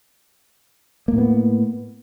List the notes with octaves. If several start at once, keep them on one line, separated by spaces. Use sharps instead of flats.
A2 A#3 B3